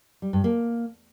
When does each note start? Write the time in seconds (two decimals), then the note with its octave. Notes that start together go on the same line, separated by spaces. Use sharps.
0.22 G3
0.33 G2
0.44 A#3